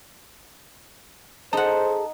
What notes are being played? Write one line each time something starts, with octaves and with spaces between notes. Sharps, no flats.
D#4 G#4 A4 C5 F#5 A5